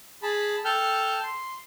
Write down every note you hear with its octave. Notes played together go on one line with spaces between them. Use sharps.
G#4 A5 B5
A4 G5 A5 F6 G6
C6